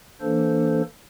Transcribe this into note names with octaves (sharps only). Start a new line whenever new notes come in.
E3 A#3 D4 A4 C5